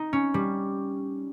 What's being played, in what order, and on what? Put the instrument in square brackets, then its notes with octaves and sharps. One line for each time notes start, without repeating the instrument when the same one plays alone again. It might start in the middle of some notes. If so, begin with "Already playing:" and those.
Already playing: [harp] D#4
C#4
G3